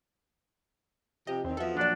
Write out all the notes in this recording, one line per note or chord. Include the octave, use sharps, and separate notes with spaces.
C3 F3 G4 D#5
E2 D#3 C4
F3 B3 F#4 A4 E5
A#2 F3 F#3 D4 D5 F#5